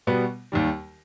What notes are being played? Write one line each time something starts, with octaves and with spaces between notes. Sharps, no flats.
B2 G3 B3
D#2 D#3 G3